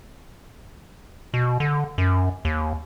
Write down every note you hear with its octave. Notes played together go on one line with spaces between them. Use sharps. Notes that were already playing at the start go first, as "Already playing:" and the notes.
B2
D3
F#2
D#2